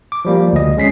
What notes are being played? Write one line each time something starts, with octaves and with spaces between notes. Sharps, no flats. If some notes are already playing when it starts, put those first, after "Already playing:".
D6
F3 G3 A#3
D2 D#5
G#3 C#4 B6 C7